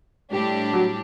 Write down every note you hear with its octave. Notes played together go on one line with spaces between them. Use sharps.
A2 G3 D4 G4
F#3